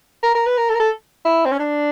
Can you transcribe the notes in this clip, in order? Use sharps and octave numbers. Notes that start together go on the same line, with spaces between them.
A#4
A#4
B4
A#4
A4
A#4
A4
E4
C4
C#4
D4